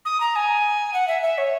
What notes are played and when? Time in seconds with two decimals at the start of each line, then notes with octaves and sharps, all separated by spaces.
0.05 D#6
0.20 A#5
0.36 G#5
0.94 F#5
1.08 E5
1.23 E5
1.38 C#5